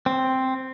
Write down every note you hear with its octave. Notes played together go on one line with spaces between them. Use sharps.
C4